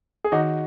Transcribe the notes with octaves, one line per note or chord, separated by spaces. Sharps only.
G#4
D#3 D#4 F#4